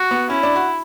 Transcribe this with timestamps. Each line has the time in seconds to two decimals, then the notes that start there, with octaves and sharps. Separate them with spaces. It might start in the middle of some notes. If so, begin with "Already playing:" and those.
Already playing: F#4
0.11 B3
0.30 C#4 E4
0.43 D4
0.56 F#4